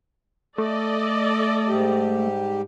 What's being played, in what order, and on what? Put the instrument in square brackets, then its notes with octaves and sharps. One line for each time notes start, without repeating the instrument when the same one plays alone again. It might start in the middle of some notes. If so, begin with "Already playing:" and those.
[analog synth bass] A3 [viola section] A4 D5 D#5
[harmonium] G#2 G3 G4